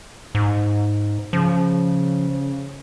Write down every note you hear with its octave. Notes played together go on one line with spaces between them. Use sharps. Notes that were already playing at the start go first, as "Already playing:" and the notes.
G#2
C#3 F3